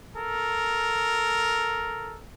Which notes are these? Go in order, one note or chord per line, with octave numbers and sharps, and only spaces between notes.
A4 A#4